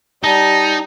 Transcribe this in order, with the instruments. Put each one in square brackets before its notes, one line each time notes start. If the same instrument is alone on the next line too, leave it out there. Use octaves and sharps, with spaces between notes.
[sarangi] G3 [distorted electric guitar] D#4 [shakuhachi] A5